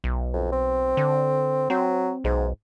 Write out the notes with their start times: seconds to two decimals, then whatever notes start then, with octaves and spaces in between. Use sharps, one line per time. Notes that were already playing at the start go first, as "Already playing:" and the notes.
0.04 B1
0.34 F2
0.52 C4
0.97 D3
1.70 F#3 C4
2.24 B1 G#2